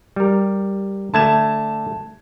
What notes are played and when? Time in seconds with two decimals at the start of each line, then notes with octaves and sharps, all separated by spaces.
0.16 G3 A#4
1.14 D3 A3 A5 G#6 E7